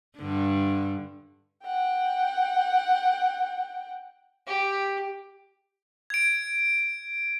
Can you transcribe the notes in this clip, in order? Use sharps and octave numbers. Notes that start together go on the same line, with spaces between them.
G2 D3
F#5 G5
G4
G#6 D7